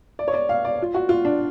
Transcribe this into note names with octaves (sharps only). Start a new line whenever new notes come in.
D5
C#5
D5
F5
D5
F4
F#4
F4
D4